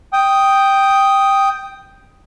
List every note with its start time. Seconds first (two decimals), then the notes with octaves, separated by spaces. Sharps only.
0.13 G5 D#6